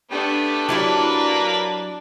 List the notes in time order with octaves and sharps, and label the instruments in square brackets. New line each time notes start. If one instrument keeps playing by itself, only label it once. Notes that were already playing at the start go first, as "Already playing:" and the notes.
[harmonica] A3 B3 [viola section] D4 [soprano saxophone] G4
[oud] F#3 E4 G4 [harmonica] A#3 A#4 B4 [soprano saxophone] A5